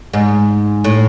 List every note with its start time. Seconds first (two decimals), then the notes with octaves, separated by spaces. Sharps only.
0.13 G#2
0.84 A2